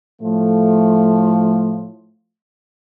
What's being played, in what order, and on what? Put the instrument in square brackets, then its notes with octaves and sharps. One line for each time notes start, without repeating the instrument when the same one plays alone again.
[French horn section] A2 F3 A3